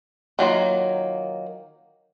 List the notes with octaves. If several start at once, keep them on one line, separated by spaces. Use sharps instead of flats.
D#3 F#3 A#3 F4